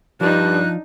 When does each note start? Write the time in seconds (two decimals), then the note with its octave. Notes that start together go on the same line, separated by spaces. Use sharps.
0.21 G2 F3 D4 D#4 F#6